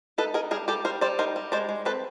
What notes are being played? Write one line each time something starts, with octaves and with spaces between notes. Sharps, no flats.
D#4 A4 B4
D#4 G#4 A#4
G3 G#4 A#4
G3 G4 A4
G3 A#4 C5
G3 C5 D5
D#4 A#4 C5
G3
G#3 C5 D5
G#3
C4 A4 B4